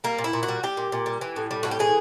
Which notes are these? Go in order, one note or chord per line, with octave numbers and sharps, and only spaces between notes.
G3 A#3
A#2
E4
A#2
F#4
G3
G3 G4
A#2
A#2
G3
E3
A2
G3
A2 F#4
G4
E3 G#4